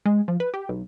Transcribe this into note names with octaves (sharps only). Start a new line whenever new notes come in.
G#3
F3
B4
G4
B1